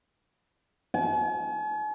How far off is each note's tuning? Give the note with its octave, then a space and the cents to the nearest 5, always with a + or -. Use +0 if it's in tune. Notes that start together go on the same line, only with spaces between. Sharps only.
G#5 +45